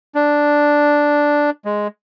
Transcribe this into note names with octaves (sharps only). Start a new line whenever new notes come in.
D4
G#3